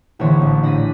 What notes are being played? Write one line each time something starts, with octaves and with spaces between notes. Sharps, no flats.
A#1 D3 E3 C5 C#5
A1
D4 A#6 B6 D#7